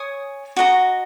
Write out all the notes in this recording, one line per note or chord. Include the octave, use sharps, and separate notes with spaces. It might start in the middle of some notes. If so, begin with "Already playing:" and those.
Already playing: C#5 G#5 D#6
F#4 D#5 A#5